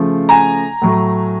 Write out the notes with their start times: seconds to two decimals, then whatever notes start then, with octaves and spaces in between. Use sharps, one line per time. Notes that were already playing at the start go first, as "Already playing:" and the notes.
Already playing: C#3 F3 A3
0.29 G#5 A#5
0.82 A2 F#3 A3